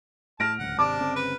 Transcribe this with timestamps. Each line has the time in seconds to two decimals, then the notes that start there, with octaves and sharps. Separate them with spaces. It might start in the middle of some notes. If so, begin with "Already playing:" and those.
0.40 A2 A5 F6 A#6 D7
0.59 D1 C#2 F#5
0.79 G#1 C3 D4 A5 D6
1.00 G1 C#3 C4
1.16 B4